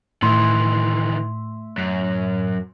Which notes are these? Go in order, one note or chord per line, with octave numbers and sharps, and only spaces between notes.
A2 D#3 E3 E5 C6
F#2